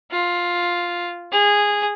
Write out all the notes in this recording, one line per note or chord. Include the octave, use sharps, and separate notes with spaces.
F4
G#4